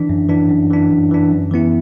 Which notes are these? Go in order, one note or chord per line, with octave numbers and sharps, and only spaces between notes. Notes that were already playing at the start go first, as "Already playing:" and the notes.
Already playing: E3 D4
F#2
E3 D4
F#2
E3 D4
F#2
E3 D4
F#2
E3 B3 E4